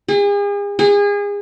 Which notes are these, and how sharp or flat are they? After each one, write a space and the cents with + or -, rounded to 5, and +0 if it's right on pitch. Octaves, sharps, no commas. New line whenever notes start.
G#4 -40
G#4 -30